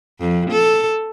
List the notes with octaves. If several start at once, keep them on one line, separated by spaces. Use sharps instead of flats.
F2
A4